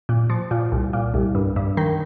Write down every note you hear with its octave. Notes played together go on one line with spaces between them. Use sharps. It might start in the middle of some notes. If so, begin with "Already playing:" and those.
A#2
F3
A#2
C2
A#2
C2
G2
G2
D#3